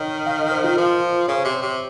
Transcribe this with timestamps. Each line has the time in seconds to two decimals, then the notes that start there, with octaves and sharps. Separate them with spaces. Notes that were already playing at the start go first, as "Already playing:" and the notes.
Already playing: D#3 C#5 D#5
0.26 F5
0.39 D#5
0.51 C5
0.64 F4
0.77 F3 A#4
1.28 C#3 C5
1.45 C3
1.54 C#5
1.62 C3